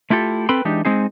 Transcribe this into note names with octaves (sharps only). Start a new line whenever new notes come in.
A3 E4 F4 G4 A4
C4 A4 B4 G5 B5 C6
E3 G#3 D4 D#4 G4
G#3 C4 D#4 G#4